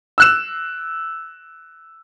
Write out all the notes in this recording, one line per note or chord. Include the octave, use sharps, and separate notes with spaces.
E6 F#6 E7